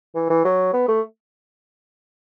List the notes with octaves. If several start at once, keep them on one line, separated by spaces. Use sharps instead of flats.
E3
E3
F#3
B3
A3